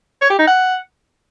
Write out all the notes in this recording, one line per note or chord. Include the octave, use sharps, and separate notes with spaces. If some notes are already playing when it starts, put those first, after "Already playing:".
C#5
G4
D#4
F#5